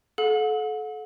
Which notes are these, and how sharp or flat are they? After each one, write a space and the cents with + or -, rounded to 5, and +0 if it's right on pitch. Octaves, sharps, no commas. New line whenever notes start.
A4 -30 F#5 -40